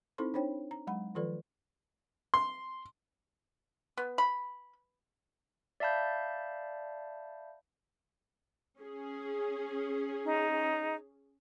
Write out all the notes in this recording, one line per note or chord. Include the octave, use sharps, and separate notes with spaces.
C4 D#4 E4 A4 C5 C6
D4 D#4 C5 C#5 G5
A#5
F#3 G#3 F#5 B5
D#3 F3 F4 A4 B4 D5
C6
B3
B5
D5 E5 F5 A5 B5 G6
C#4 G#4
D#4